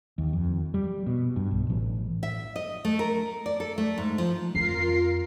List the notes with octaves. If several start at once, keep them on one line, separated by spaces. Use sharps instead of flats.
D#2
F2
G3
B2
G2
B1
A1
E5
D#5
A3
A#4
D5
A4
A3
G#2
F3
F2 F4 A#4 C7